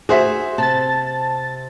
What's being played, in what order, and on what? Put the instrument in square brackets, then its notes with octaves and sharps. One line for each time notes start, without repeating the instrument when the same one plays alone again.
[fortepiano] F#4 C5 E5 [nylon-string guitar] G#4
[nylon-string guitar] C3 [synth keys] A5 A6